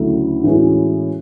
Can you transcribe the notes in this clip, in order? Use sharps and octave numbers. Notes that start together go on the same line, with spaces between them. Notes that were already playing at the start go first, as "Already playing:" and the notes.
Already playing: D2 C#3 F#3 A3 E4
A2 E3 G#3 C#4 F#4